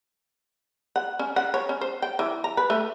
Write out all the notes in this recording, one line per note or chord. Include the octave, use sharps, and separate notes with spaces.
F#5
C#4
F#5
C#5
C#4
C5
G5
E3
A#5
B4
A3